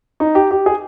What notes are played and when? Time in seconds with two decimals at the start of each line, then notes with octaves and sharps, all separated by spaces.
0.20 D#4
0.35 G4
0.51 G4
0.66 G#4